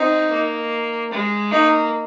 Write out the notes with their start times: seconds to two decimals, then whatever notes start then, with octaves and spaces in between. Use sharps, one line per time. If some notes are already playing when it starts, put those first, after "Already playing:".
Already playing: C4 D#4
0.30 A#3
1.11 G#3
1.51 A#3 D#4